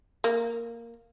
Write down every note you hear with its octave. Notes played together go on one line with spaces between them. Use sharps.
A#3